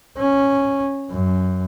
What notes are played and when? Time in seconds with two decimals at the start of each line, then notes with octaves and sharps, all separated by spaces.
0.18 C#4
1.11 F#2